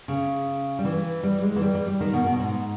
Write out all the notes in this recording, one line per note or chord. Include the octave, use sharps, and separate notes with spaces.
C#3
G3
E3
G3
G#3
E3
G3
G3
G3
D#3
B2
B2
G#2